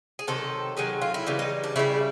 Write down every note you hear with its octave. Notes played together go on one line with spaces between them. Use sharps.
G#4
C3 D#3 F#3 A4
C3 D#3 F#3 G#4
F4
E4
C#3 E3 G3
D#4
D4
C#3 E3 G3 E4